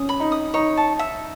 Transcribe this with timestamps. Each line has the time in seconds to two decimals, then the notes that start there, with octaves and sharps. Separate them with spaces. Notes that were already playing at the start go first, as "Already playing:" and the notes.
Already playing: C#4 D#6
0.09 B5
0.20 D#4
0.32 D#6
0.54 D#4 C#5
0.77 A5
0.99 E5